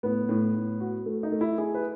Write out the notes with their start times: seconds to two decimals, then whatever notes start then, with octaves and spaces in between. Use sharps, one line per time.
0.03 A2 B3
0.29 A2
0.55 A2
0.80 F#4
1.06 A3
1.23 D#4
1.32 A3
1.41 E4
1.58 E4 G#4
1.74 B4